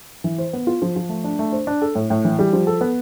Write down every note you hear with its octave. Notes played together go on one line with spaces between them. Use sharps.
E3
C5
B3
F4
F3
F3
A3
D4
A3
C5
D4
A4
A2
A2
E3
G3
F3
A4
B3